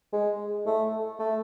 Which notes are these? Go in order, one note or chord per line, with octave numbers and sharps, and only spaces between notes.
G#3
A3
A3